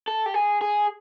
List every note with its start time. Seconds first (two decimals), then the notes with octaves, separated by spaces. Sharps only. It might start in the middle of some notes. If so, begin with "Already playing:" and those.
0.08 A4
0.26 G4
0.34 G#4
0.61 G#4